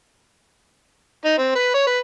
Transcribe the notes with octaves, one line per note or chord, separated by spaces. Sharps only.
D#4
C4
B4
C#5
B4